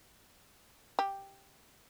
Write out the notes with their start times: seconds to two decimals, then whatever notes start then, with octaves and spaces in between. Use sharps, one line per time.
0.99 G4